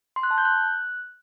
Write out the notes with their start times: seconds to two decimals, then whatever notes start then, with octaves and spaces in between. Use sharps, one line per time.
0.16 C6
0.23 F#6
0.31 A5
0.38 G6
0.45 F#6